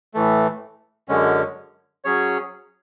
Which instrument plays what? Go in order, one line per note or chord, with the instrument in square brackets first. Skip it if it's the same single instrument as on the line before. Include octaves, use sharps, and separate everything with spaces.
[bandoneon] A2 E3 A3
F#2 D3 G#3 C#4
F#3 C#4 G#4 C#5